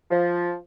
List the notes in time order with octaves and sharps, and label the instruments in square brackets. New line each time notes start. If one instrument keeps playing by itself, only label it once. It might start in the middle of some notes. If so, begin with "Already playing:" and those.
[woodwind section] F3